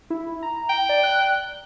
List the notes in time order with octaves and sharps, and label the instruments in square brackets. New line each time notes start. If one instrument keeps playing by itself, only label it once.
[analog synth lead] E4
A#5
[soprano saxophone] G5
[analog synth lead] D5
F#6